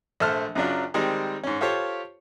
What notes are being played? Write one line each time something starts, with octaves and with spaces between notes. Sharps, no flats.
A#1 A3 C5 A5 F6 F#6
F#2 C#3 F#3 D4 F4
D#3 G3 G#3 C4
G#2 C#4
F4 G4 A4 C5 C#5